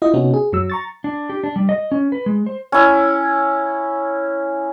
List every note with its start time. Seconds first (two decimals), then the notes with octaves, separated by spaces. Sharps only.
0.02 E4 F4 D#5
0.14 C3 B3 C#4 D#4 F#4
0.34 G#4
0.52 F#2 F#3 E6
0.70 A#5 C#6 A6
1.04 D4
1.30 G4
1.43 D4
1.56 G3
1.69 D#5
1.92 C#4
2.12 B4
2.26 G#3
2.46 C5
2.72 C#4 E4